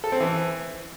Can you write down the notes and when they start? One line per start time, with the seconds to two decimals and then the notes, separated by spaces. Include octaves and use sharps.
0.04 A4
0.12 C4
0.20 E3